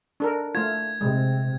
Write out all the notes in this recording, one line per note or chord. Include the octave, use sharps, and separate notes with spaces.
D4 A4 A#4
A3 F4 G#6
C3 G#3